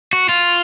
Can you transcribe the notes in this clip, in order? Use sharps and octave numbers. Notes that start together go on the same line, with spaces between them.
F#4
F4